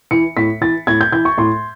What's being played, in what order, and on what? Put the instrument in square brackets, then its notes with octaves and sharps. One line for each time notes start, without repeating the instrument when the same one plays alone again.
[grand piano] E3 C#7
A2 B6
E3 A6
A2 G#6
G6
E3 G6
C#6
A2 C6